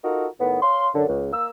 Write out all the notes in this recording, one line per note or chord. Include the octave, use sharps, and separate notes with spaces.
D#4 F4 F#4 A4 A#4
A2 D#3 B3
C#5 F5 C6
F#2 D3
C#2
A#3 E6